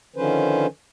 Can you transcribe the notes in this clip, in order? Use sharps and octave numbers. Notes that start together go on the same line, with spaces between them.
D3 D#3 F3 C#4 B4 C5